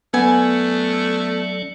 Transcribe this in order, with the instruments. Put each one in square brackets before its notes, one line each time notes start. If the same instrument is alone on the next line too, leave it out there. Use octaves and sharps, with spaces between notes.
[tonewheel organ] F#3 C#4 D5 [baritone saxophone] A3 [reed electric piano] B3 [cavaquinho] G#5